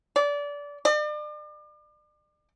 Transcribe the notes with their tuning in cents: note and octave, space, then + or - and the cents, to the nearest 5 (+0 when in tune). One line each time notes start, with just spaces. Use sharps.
D5 -25
D5 +40